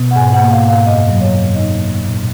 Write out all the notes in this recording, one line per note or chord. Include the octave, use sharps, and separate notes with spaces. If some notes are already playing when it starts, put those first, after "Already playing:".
Already playing: B2 B3
F#5
G#2 G#5
F#5
A#3
F5
G#2
F5
F#2 D#5
F#3
C#5
F#2
D#4 D#5
A#3
A#2